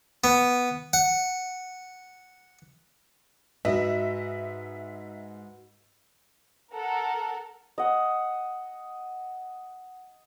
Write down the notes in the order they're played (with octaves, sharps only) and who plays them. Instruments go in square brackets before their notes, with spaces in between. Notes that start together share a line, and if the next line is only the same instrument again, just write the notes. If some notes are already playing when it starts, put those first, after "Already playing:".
[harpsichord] B3
F#5
[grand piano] G#2 D#5 [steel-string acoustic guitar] F#4 B4 [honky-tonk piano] E5
[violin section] A4 A#4 F#5
[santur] D#5 F#5